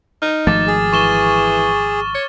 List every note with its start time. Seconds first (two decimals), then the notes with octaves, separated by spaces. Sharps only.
0.22 D#4 F6
0.47 G#1 F3 A3 D6 A6
0.67 G#4
0.93 E3 C#6 E7 G7
2.15 C#5